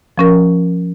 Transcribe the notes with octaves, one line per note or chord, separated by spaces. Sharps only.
F3 C#4 A#4